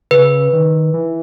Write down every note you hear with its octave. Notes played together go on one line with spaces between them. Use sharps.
C#3 B4
D#3
E3